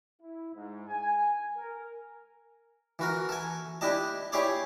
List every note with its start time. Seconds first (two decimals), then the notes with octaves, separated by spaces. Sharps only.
0.20 E4
0.54 G#2
0.88 G#5
1.56 A#4
2.99 E3 F#4 A#4
3.29 A4 G#5
3.81 D4 E4 G4 D#5 A5
4.32 E4 G4 G#4 C#5 D5 D6